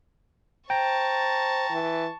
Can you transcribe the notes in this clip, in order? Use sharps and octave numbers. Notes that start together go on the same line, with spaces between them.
C5 G5 A5 A#5 C#6
E3